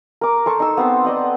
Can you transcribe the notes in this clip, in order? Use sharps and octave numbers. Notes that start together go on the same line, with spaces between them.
A#4 D6
A4 C5 C#6
D#4 E6
B3 C4 C5
D5 D#5 F#5